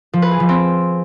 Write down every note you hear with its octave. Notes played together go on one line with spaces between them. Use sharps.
F3
B4
G#4
F3
C4